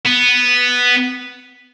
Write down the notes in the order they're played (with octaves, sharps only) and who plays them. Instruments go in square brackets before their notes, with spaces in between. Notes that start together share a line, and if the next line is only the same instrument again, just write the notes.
[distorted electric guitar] B3